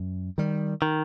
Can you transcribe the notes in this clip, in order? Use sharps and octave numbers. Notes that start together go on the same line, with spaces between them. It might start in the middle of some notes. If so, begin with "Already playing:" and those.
Already playing: F#2
D#3 G3
D#3